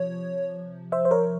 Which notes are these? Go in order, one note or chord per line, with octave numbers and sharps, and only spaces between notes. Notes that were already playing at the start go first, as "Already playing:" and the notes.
Already playing: C3 F3 C#5
C5 E5
C5
A#4 C#5